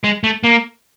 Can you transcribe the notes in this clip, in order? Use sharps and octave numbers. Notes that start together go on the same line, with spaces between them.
G#3
A3
A#3